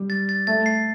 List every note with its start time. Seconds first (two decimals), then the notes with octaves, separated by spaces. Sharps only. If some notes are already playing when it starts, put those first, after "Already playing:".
Already playing: G3
0.10 A6
0.29 A6
0.47 A3 A6
0.66 C7